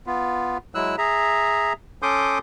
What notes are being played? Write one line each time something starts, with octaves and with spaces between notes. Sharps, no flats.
B3 F4
F#3 G#3 E4 E6 F#6
G#4 E5 A#5
C#4 A4 C6 D6 D#6 G6